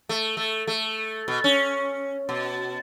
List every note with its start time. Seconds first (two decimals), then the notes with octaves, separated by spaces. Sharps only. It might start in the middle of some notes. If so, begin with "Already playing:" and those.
0.09 A3
0.37 A3
0.67 A3
1.28 B2
1.44 C#4
2.29 B2